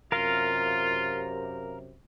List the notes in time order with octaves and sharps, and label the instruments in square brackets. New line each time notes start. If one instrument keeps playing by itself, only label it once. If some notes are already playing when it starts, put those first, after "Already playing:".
[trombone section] F#2 C3 [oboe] F4 [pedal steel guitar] A#4 F5